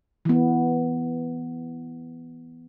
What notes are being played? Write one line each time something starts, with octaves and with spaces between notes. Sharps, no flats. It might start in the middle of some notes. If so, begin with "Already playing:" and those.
E3 B3